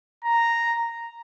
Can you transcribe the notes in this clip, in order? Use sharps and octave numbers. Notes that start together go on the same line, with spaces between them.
A#5